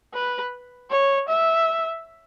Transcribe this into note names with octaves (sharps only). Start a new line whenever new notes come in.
B4
C#5
E5